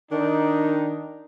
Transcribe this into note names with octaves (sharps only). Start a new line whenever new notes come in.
D#3 D4 D#4